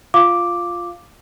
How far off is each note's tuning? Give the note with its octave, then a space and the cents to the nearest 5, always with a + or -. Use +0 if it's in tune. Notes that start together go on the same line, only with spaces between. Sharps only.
F4 +0 F5 +0 D6 +0